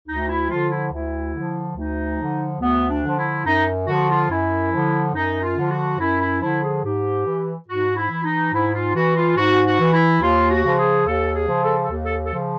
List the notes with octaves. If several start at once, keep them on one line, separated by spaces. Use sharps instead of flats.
D2 D#4
E4
D3 F3 F4
E4
D2 E4
D3 F3
D2 D#4
D3 F3
D2 B3
D4
D3 F3
E4
F#2 D#4
D3 F3 F#4
F4
F#2 E4
D3 F3
F#2 D#4
F4
D3 F3
F#4
F#2 E4
E4
D3 F3 E4
G#4
G#2 G4
E3
G#2 F#4
E4
E3
D#4
G#2 E4
F4
E3 F#4
F4
G#2 F#4
F#4
E3
E4
D#2 F4
F#4
C#3 F3
G#4
D#2 A4
G#4
C#3 F3
A4
A4
D#2
A4
A4
C#3 F3